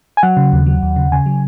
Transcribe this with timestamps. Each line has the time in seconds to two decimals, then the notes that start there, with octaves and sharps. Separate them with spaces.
0.17 G#5
0.23 F#3 F#5
0.37 C#3
0.53 D#2
0.67 F#3
0.83 D#2
0.96 C#3
1.12 C#3 G#5
1.26 F#3